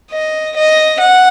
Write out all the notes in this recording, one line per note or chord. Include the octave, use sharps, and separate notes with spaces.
D#5
D#5
F#5